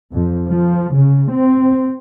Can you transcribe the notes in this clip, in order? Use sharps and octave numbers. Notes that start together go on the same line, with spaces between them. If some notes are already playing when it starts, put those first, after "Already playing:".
F2
F3
C#3
C4